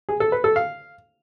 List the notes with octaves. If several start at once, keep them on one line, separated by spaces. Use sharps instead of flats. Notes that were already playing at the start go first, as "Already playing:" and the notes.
G#4
A4
B4
A4
F5